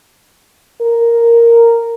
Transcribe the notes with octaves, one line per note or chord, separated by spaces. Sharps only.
A#4